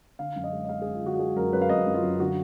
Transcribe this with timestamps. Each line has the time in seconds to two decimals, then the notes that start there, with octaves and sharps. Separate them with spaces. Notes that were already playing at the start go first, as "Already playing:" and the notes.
0.19 D3 F5
0.36 F#2
0.44 D#5
0.53 G#3
0.65 D#5
0.69 G#3 F5
0.82 F#2 G#4
0.95 F4
1.02 D3 F#4
1.14 F#4
1.19 G#3 G#4
1.36 F#2 A#4
1.53 F#2 B4
1.61 F5
1.69 F#2 D#5
1.86 F#2
1.94 F4
2.03 F#2
2.19 D3 F#4